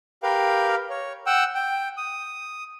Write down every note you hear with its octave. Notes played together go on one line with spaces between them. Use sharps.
G4 A#4 B4 F5 G5
C#5
F#5 G5 E6
G5
D#6